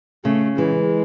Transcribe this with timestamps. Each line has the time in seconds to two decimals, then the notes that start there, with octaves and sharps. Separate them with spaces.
0.25 C#3 A3
0.57 E3 G#3